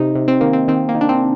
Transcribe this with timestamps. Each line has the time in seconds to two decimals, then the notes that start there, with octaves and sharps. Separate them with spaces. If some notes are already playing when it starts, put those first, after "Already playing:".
Already playing: C3 D#4
0.15 C3
0.28 C4
0.41 D#3 A#3
0.53 C4
0.68 D#3 C4
0.89 A#3
0.95 D#3
1.01 D4
1.09 C4